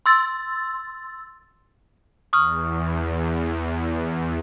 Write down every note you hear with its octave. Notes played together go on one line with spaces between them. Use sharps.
C6 E6 A6
E2 C#6 D#6 F6